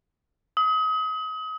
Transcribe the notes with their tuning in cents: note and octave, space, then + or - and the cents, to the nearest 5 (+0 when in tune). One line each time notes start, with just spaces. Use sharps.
D#6 +35